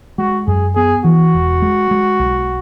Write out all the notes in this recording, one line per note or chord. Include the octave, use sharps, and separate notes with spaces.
G#3 F#4
F#2 G#4
B3 G#4
E3 F#4
E1
G#3
G#3
B1